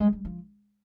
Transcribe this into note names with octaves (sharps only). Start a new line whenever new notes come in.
G#3
G3
F3